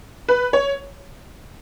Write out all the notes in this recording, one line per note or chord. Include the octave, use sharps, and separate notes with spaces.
B4
C#5